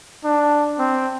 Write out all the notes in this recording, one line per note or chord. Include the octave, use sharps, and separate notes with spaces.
D4
C4